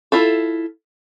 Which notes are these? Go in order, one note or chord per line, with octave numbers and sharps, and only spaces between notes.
E4 F4 A4